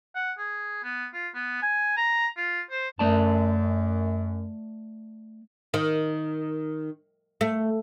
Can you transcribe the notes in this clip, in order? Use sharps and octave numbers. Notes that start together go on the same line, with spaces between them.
F#5
G#4
B3
F4
B3
G#5
A#5
F4
C5
F#2 A3 D5 A5
D#3
A3